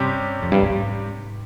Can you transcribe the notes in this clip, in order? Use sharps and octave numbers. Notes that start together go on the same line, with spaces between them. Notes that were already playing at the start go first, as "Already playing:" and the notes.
Already playing: G2 C3 G3 C#4 G4
F2
G2
G#2